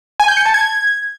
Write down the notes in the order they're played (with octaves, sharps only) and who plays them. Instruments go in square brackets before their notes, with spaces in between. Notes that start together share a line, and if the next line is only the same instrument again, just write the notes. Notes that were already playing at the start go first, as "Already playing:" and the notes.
[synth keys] G#5
G6
C#7
A5
G#6